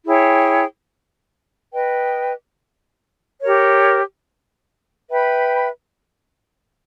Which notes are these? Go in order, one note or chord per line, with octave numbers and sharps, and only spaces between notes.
E4 G#4 C#5 G5
B4 D#5 G5
G4 A#4 C#5
B4 E5 G5 B5